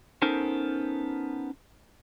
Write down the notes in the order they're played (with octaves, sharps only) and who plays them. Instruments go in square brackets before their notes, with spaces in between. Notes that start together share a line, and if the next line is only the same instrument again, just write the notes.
[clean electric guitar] B3 C#4 D#4 A4 A#4 C5